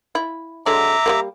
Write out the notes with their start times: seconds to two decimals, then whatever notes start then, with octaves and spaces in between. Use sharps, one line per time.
0.15 E4
0.66 D3 F#3 G#3 E5 A#5 D6
1.06 G3 A3 A#3